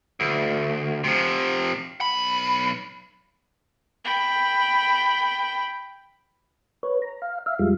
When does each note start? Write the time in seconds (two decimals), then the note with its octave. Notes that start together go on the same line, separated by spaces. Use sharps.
0.20 D2
1.04 C3 F3
2.01 B1 B5
4.05 G5 B5
6.83 B4 C#5
7.02 A#5
7.22 F5
7.46 E5 F5
7.59 F2 G3 G#3 F4